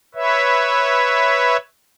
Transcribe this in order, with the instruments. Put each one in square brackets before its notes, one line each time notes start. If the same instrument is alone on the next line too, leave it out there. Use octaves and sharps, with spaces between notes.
[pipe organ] B4 C#5 E5